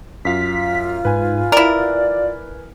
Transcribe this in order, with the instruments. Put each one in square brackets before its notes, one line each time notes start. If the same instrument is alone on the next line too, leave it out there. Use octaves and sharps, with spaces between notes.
[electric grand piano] F#2 F5 [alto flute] F4 [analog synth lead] B6
[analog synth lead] G#2 [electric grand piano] B4 G#5
[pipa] E4 A#4 [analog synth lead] D5